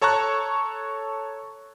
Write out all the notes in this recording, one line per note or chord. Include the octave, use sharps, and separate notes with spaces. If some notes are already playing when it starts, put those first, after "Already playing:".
A4 C#5 A5 A#5 C#6 F#6